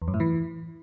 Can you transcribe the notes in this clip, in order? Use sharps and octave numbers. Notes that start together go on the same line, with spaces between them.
E2
F#2
A2
E3